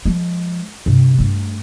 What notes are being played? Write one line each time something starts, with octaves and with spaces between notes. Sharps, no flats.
F3 G#3
G2 C3
G2 A3